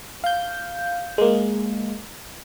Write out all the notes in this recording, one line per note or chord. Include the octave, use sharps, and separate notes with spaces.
F5 G6
G#3 A#3